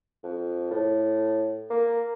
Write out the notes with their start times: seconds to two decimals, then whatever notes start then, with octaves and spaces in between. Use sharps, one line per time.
0.24 F2
0.71 A2
1.70 A#3